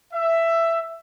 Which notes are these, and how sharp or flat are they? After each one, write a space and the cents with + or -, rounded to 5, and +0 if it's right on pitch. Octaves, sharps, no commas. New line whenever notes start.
E5 +10